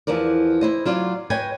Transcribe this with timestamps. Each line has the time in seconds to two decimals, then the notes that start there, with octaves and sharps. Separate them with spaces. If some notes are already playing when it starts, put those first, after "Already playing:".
0.07 E2 E3 F3 A#4 D5
0.61 E4 C5 D#5
0.85 F#3 F4 D5
1.30 B4 C#5 D#5 G5 G#5